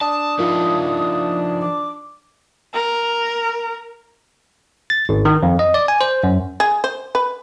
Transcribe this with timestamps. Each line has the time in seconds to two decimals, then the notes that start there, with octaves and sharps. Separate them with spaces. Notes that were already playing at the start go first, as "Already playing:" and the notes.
0.01 D4 A5 D#6
0.39 F3 D#4 F4 A#4
1.61 D6
2.74 A#4
4.90 A6
5.09 G#1
5.25 D#3
5.43 F2
5.59 D#5
5.74 D5
5.88 G#5
6.01 C5
6.23 F#2
6.60 G#4
6.84 C5
7.15 B4